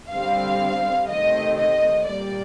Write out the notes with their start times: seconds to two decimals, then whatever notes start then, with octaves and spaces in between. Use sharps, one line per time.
0.12 D3 G3 C4 F5
1.09 C3 D#3 A3 C4 D#5
1.58 D#5
2.06 A#2 G3 A#3 D5